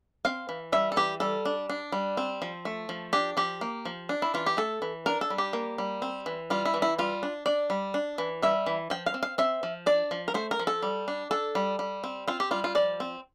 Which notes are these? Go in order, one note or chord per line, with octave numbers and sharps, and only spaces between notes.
C4 F5
E3
G3 E5
A4
E3 G4
G3 A4
D4
D4
G3
C4
F3
A3
F3
D4 G4
F3 G4
A#3
F3
D4
E4
E3 F4
G4
A3 A4
E3
D4 A#4
A4
G3
G4
A#3
G3
C4
E3
G3 F4
E4
E3
E4
G3 F4
D4
D4 D5
G3
D4
E3
G3 E5
E3
F3 G5
F5
C4
F5
C4 E5
F3
D4 D5
F3
A#4
A3 C5
A#4
F3
A4
G3
D4
D4 A4
G3
G3
C4
C4 F4
G4
G3 F4
F4
F3 D5
C4